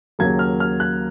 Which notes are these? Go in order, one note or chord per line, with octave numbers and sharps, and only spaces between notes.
D#2 C#3 F#3 A#3 G#6
F6
F6
F#6